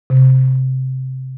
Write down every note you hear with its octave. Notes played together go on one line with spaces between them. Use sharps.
C3